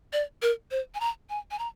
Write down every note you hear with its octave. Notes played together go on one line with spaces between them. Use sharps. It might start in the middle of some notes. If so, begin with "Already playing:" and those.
D5
A#4
C5
G#5
A#5
G#5
G#5
A#5